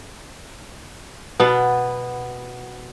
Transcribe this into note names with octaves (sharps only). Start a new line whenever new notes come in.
B2 B3